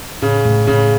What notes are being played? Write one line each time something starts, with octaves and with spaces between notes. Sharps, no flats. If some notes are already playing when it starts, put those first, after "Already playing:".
A2 C#3
A2
A2 C#3